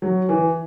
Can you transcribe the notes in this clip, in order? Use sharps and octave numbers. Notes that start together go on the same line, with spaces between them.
F#3
E3